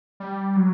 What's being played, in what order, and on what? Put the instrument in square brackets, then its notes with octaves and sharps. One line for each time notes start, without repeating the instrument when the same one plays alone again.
[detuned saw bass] G3
F#3